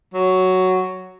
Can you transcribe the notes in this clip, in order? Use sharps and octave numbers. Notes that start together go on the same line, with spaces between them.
F#3